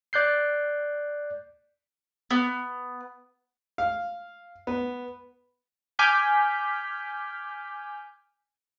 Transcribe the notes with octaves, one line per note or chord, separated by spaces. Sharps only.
D5 F#6 G6 C7
B3
F5
B3
G#5 D6 F6 G6 B6